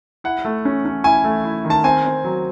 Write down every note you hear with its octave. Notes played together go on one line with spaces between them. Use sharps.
E4 F#5
A3
C#4
C#4
E4 G#5
A3
E4
D#3
A5
C4 G#5
C4
F#3